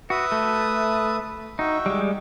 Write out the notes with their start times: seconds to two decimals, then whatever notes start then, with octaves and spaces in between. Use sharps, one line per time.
0.10 F#4 B4 E5 D#6
0.32 A3
1.59 D#4 F#4 E5 G5
1.86 G3 G#3